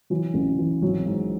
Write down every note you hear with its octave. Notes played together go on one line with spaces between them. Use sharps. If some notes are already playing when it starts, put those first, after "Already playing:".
E3 F#3
A1
E3
G#1 F#3
G#2